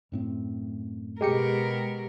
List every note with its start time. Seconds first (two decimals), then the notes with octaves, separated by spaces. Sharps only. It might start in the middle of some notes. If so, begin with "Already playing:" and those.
0.12 F#2 A2 C4
1.21 B2 G#3 G4 A#4 C#7